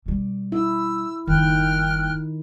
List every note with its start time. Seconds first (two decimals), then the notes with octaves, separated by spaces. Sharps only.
0.06 B2 G3
0.52 E4 E6
1.28 F#1 G2 D#3 G5 F6 F#6